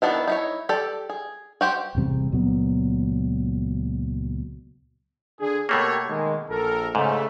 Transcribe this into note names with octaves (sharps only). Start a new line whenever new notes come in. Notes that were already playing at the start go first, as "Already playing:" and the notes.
D#3 F#3 B3 D4 E4
D#4 E4 C#5
G4 A4 D5
G#4
F#4 G4 C5 G5
A1 E2 C3 G3
C#2 A#2 F#3 B3
D3 G#4
B2 A3 A#3 G4 A#4 C#5
D#3 G#3
A#1 A4 A#4
G#2 C#3 A3